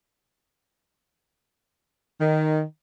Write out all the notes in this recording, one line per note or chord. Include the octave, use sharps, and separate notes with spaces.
D#3